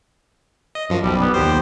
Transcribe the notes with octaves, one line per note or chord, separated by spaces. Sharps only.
D#5
F#2 F3
B1 G3
B3
D#2 G4 C5